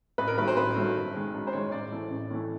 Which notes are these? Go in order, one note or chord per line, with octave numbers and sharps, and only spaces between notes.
A1 B4
A#4
G2 D#3 F#3 A3 B4
C5
A1 B4
G2 D#3 F#3 A3
F#2
D#3 G#3
F#2
C5
D#3 G#3 C#5
A1 D5
A2 E3 A3
A1
A2 E3 A3